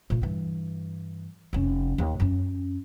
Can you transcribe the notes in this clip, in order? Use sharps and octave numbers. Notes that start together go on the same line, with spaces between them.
A#2 A3
G2 E3
F1 C#4
D#2
F#2 C#4